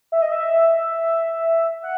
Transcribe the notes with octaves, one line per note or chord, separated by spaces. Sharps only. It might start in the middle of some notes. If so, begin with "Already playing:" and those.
E5
D#5
E5
F#5